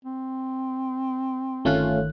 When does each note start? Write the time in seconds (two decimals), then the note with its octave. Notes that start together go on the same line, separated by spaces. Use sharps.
0.05 C4
1.65 G1 D#3 A3 C#4 F4 F#6